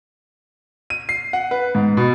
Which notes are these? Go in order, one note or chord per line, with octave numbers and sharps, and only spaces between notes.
D#7
C7
F#5
B4
G#2
B2